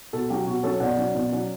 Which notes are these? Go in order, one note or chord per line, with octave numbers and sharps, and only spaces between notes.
B2 F#4 A4
F#3 C#4 G4
B2 F#4
F#3 C#4 A4 C#5
B2 D5 F#5
F#3 C#4
B2
F#3 C#4